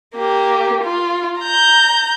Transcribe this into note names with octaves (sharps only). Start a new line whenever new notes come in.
A#3 G4
F4
A#5 G6